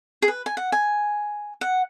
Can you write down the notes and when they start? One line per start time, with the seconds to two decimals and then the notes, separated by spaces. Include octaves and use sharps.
0.22 G#4
0.28 B4
0.46 G#5
0.57 F#5
0.72 G#5
1.61 F#5